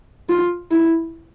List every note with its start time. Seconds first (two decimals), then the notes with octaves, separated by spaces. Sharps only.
0.29 F4
0.71 E4